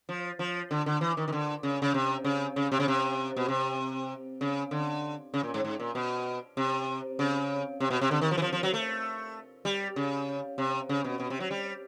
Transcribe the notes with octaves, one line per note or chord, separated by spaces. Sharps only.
F3
F3
D3
D3
E3
D#3
D#3
D3
C#3
C#3
C3
C#3
C#3
C3
C#3
C3
B2
C3
C#3
D3
C#3
A#2
G#2
G#2
A#2
B2
C3
C#3
C3
B2
C3
D3
D#3
F3
E3
F3
F3
F#3
A3
G3
C#3
C3
C#3
B2
B2
C3
F#3
G3